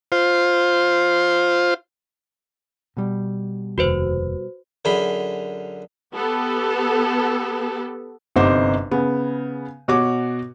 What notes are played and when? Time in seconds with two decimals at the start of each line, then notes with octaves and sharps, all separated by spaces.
0.12 F4 C5
2.97 B2 G3
3.78 F1 D#2 F#4 B4 C5
4.85 F#2 D3 G#4 B5 C6
6.15 B3 G4 A4
8.36 G1 C3 D#4 C5 D6
8.91 C#3 B3
9.88 B2 F#4 C#5 D6